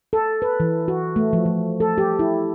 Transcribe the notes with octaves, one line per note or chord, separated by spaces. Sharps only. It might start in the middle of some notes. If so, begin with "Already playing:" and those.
A4
B4
E3
F#4
A3
F3
F3
A4
G4
E4